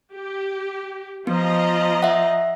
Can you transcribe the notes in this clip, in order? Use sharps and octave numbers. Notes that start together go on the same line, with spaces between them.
G4
F3 B3 D#5 A#5
E5 F#5